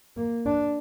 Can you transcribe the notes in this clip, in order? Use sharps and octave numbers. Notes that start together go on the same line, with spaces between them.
A#3
D4